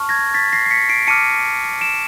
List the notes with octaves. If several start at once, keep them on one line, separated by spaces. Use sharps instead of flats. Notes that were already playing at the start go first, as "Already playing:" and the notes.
Already playing: A5 C#6 F6
G#6 A#6
A6 B6
A#6 C7
C7
B6 C#7
C7 D7
A5 D6 F6 C#7 D#7
D7 E7